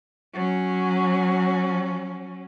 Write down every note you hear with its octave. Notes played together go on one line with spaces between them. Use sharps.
F#3 C#4